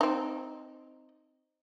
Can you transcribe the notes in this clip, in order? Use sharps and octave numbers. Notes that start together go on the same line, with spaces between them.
C4 D#4